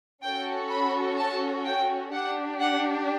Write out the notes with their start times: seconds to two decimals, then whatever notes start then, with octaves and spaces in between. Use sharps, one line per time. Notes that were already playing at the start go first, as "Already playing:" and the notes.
0.23 C#4 F#4 A4 G5
0.71 B5
1.18 A5
1.65 G5
2.13 D4 G4 F#5
2.60 F#5